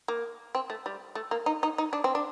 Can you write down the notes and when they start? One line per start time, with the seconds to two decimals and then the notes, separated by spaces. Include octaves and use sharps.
0.08 A#3
0.55 C4
0.70 A3
0.86 G3
1.15 A3
1.31 A#3
1.46 D#4
1.63 D#4
1.78 D#4
1.93 D4
2.04 C4
2.15 D4